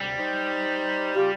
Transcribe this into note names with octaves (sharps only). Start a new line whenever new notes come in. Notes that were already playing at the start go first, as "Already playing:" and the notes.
D2 C3 G3
D#4 C5
C#3 F4 G4